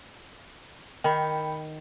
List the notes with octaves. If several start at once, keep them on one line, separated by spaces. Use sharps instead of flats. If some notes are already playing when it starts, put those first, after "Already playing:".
D#3 G5 B5